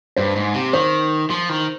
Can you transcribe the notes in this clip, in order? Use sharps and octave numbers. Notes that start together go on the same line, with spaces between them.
G2 C5
G#2
C3
D#3 C5
F3
D#3